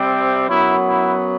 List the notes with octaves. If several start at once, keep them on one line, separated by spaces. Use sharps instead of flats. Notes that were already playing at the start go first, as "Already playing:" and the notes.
Already playing: C3 G3 C4
F#2 F#3 B3 E4
E4